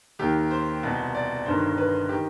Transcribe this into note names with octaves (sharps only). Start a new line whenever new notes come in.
D#2 D#3 G4
C5
C2 B2
D5
G1 G2 D#3 C5
B4
D#3 G4